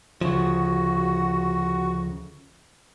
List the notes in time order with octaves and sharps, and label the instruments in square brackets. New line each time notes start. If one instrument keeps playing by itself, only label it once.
[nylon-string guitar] D2 C#3 [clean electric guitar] F3 [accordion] F#4